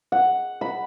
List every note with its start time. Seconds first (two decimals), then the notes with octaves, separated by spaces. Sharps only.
0.12 F#5
0.61 B5